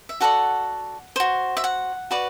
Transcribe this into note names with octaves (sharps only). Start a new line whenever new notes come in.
E5
F#4 A4 D5 F#5
F#4 C5
E5
F#5
F#4 B4 D5